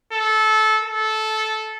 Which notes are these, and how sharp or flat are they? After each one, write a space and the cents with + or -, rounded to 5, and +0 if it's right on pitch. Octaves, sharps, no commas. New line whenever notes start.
A4 -20
A4 -15